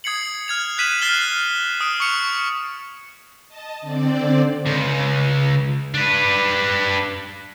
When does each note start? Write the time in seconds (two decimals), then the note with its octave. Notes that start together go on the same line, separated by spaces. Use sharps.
0.04 D#6 G#6 C7 C#7 F#7
0.48 F6 G#6 F7
0.78 F#6 G#6 B6 D#7 E7 F#7
1.02 F6 A6 C7 E7 F#7 G7
1.81 D#6 D7
2.00 C#6 F6 C#7 F7
3.48 D#5 A5
3.82 D3 C4 D5
4.66 C#2
5.94 D4 B4